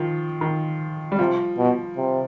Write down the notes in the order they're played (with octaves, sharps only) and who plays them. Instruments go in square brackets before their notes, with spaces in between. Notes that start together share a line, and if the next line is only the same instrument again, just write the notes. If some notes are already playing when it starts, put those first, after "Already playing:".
Already playing: [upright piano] D#3 F3
D#3
G3
[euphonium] C3 [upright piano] F3
[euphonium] B2
C3